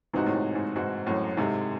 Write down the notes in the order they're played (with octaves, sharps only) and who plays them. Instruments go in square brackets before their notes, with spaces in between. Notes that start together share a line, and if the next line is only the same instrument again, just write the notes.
[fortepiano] G#2 C3 [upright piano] E3 C4 D#4 F#4
[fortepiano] A2
G#2
G#2
[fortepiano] G#2 [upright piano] E3 C4 D#4 F#4
[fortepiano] F#2 A2
[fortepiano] G#2 C3 [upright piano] G#3 C4 E4 A4 D#5